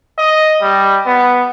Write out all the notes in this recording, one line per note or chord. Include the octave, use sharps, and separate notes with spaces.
D#5
G3
B3